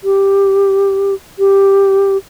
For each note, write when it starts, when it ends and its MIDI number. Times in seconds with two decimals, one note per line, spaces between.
0.04 1.14 67
1.39 2.17 67